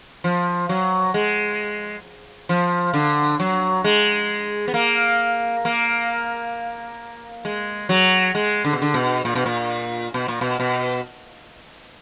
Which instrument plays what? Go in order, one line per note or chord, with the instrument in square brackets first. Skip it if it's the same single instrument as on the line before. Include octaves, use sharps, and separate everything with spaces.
[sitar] F3
F#3
G#3
F3
D3
F#3
G#3
B3
A#3
A#3
G#3
F#3
G#3
D3
B2
D3
B2
A#2
B2
A#2
B2
A#2
B2
B2